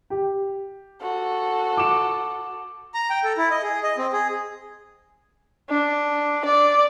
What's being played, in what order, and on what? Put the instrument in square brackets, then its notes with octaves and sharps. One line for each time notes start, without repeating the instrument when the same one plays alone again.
[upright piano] G4
[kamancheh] F#4 A4
[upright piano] D6 E7
[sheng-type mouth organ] A#5
G5
A4
E4
D#5
G#4
D#5
C4
G#4
[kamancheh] D4
D5